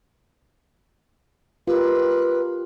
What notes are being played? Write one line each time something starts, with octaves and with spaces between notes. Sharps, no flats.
F4 G4 A#4 B4